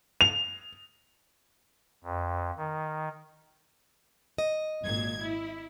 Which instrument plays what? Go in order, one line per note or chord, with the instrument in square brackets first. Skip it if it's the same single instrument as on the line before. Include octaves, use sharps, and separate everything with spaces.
[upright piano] F7
[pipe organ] F2
D#3
[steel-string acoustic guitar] D#5
[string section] G#1 A#2 G#6
E4